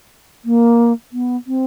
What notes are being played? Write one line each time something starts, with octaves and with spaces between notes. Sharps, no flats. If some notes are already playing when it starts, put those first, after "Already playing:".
A#3
B3
C4